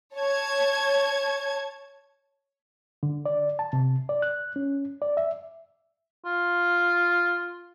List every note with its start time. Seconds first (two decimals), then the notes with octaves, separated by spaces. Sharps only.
0.17 C#5 A5 G#6
3.03 D3
3.26 D5
3.59 A5
3.73 C3
4.09 D5
4.22 F#6
4.56 C#4
5.02 D5
5.17 E5
6.25 F4